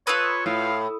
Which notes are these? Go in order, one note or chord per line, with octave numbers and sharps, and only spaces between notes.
F4 A4 B4 C#5 B5 D#6 E6
A2 F5